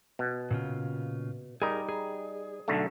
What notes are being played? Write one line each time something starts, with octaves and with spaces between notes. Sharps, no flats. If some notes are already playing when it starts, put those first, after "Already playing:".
B2
A#2 C#3 F4
G3 D#4 G#4 A#4
G#4
B1 D3 A3